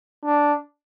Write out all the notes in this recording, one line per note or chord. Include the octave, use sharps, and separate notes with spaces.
D4